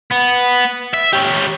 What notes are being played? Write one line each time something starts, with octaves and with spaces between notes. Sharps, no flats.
B3
E5
C#4 G4